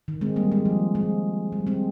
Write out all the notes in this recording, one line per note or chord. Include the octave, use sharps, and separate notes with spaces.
D#3
G#3 C4
G3 A#3
G#3
F3
G#3
G3
G#3 C4